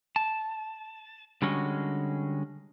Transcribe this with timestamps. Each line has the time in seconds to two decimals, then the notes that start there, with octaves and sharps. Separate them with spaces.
0.16 A5
1.42 D3 G3 G#3 C#4 F#4